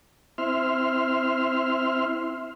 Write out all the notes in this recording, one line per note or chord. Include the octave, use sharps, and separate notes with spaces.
C4 E4 E5 C6 F6